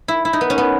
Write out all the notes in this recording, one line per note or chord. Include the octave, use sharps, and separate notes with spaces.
E4
E4
D#4
B3
C#4
B3